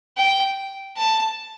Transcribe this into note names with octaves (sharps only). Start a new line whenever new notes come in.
G5
A5